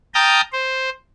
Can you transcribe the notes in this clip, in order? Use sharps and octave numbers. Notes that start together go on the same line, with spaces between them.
G5 A5 A#5 D#6 F6 G6
C5